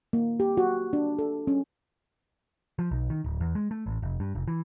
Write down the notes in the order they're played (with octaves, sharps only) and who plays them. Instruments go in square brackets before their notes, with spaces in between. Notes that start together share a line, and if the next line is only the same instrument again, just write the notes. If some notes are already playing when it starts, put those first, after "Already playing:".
[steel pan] A#3
G4
F#4
D4
A4
C#4
[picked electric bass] F3
B1
D#3
D1
E2
G#3
A3
A1
F1
G2
F1
E3